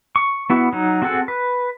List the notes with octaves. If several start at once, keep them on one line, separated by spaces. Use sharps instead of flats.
C#6
B3 E4 F#4
F#3 D#4
C4 F#4 G#4 A4 F#5
B4